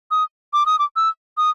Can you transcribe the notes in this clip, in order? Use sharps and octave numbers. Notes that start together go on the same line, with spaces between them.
D#6
D6
D#6
D6
E6
D#6